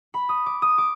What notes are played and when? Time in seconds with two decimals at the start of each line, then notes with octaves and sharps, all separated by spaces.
0.14 B5
0.29 D#6
0.46 D6
0.62 D#6
0.78 D6